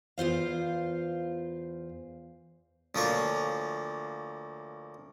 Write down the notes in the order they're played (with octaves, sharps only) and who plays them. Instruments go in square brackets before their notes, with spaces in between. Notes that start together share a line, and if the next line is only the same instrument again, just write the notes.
[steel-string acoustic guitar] E2 F4 C5 F5
[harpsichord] D2 F3 A#3 C#5 C#6